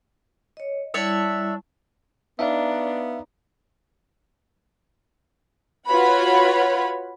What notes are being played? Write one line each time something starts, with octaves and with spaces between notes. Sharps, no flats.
C#5 D#5
G3 D4 E4 C#5 E5 A5
B3 D4 D#4 E5 F5 A#5
F4 F#4 B4 C#5 F#5 B5